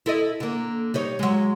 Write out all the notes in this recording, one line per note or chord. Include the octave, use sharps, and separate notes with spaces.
E4 A4 D#5
D3 A#3
G3 D#4 C#5
F#3 G#3